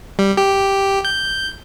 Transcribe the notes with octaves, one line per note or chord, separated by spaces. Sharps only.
G3
G4
G6